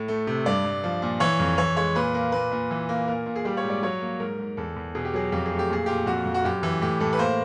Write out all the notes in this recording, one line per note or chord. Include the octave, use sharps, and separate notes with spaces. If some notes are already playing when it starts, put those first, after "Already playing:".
Already playing: A2
A3
C3
G2 D5
G2
F3
A#2
E3 C#5
F2
E3 C#5
G#3 C#5
A#2 B4
A#3
A#2 B4
A#2
E3
A#3
A#2 A#4
A#2
G#4
G3 G4
C#5
G#2
D5
F#3 C#5
A#3
G#2 A#4
G#2
E2 A4
E2
B2 G#4
G4
F#3 G#4
F2 G4
G#4
A3
G4
A#2 G#4
A#2 G4
F2 F#4
F2
F#4
F#2 G4
E3
A2 G4
A2 A4
B4
A#3 C5